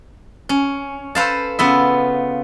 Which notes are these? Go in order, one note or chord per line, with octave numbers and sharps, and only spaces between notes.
C#4
A4 B4 C5 F5 A5
C#3 B3 F4 E5